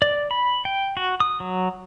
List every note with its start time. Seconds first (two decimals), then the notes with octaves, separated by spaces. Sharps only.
0.02 D5
0.31 B5
0.65 G5
0.97 F#4
1.20 D#6
1.40 F#3